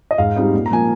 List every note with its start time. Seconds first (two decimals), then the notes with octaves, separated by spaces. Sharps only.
0.11 D#5
0.18 G#2 F5
0.36 G3 C4 D#4
0.54 A#2
0.66 A#5
0.71 F3 A#3 G#5